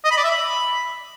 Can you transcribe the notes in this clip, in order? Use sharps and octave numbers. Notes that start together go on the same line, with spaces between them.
D#5
B5
D5
E5
B5